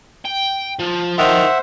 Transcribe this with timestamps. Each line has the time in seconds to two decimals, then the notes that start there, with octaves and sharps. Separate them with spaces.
0.25 G5
0.79 F3
1.18 D#3 C5 E5 F#5